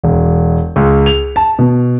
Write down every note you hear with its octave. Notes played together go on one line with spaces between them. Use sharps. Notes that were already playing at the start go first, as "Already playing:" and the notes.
E1
C#2
F7
A5
B2